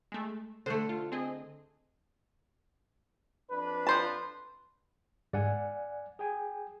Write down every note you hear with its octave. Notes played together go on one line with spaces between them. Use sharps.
G#3 A3
D3 A3 C5
F4
C4 G#4 D#5
F2 D4 B4
F3 C5 A5
G#2 D5 F#5 G#5
G#4 G5 G#5